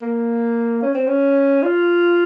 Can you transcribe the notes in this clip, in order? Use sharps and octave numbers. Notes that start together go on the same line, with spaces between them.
A#3
C#4
C4
C#4
F4